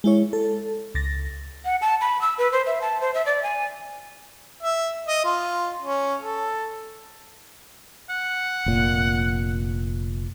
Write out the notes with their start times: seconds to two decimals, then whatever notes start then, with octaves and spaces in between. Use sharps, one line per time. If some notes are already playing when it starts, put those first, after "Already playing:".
0.04 G#3 E4 C#5
0.33 A4
0.95 C#2 A6 A#6
1.65 F#5
1.81 A5
2.01 B5
2.21 E6
2.38 B4
2.52 C5
2.66 E5
2.82 A5
3.01 C5
3.14 E5
3.26 D5
3.43 G#5
4.63 E5
5.07 D#5
5.25 F4
5.82 C#4
6.21 A4
8.10 F#5
8.66 F1 A#2